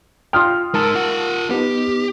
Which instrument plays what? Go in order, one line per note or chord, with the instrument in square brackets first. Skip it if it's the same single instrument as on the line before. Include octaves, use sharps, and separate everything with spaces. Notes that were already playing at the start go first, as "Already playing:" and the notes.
[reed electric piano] F4 G5 [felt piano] C6 D#6 F6
[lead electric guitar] G#3 D#4 [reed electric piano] A#4 A5 E6
[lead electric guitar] F4 F#5
[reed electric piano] B3 D#4 [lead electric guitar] G4